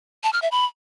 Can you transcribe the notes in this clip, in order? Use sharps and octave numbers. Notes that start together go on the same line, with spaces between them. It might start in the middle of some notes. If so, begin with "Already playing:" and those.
A5
F6
E5
B5